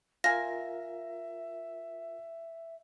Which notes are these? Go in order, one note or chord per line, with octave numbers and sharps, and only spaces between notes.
F4 A#4 E5 F5 G#5 A#6